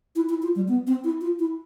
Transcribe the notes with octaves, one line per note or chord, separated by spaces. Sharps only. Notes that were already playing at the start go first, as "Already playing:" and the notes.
E4
E4
F4
G3
B3
C4
E4
F4
E4